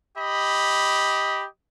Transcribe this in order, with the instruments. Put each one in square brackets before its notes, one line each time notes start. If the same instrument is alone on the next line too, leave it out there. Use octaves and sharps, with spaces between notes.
[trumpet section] G4 D#5 B5